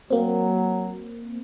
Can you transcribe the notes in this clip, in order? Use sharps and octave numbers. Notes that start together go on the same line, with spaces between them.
F#3 A#3 C4